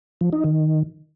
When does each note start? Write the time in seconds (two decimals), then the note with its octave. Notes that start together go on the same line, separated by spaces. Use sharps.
0.21 F3
0.33 D#4
0.44 D#3